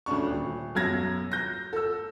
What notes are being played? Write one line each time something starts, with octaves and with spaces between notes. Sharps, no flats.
D2 C#4 D4 C#6
D#1
B1 F#2 G#6 A#6
G6 A#6
A4 E6